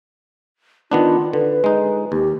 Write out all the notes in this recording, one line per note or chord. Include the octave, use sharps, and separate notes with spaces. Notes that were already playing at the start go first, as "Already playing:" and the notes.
D#3 B3 D4 F4
D3 B4
G#3 D#4
D#2 G4